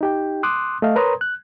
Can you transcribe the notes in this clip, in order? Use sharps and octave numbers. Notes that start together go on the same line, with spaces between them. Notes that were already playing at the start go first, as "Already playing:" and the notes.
D#4 G4 G5
C6 D6 D#6 F#6
A3 D#5 F5
A#4 B4 C#5 A#5 C6 D#6
F#6